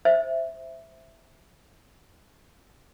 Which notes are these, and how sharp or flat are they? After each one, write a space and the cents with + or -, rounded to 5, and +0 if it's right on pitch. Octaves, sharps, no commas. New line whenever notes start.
C5 +0 E5 +0